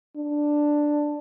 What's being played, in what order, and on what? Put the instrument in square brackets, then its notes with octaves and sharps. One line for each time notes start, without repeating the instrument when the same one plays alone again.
[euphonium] D4